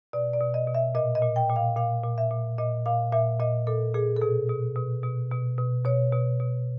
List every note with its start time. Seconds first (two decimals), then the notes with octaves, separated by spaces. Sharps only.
0.13 B2 D5
0.33 D5
0.40 B2
0.54 D#5
0.68 B2
0.75 E5
0.95 A#2 D#5
1.15 D#5
1.22 A#2
1.36 G5
1.49 A#2
1.56 F5
1.77 A#2 F5
2.04 A#2
2.18 E5
2.31 A#2
2.58 A#2 D#5
2.86 A#2 F5
3.13 A#2 E5
3.40 A#2 D#5
3.67 A#2 A4
3.94 A#2 G#4
4.17 A4
4.21 B2 G#4
4.49 B2
4.76 B2
5.03 B2
5.31 B2
5.58 B2
5.85 B2 C#5
6.13 B2
6.40 B2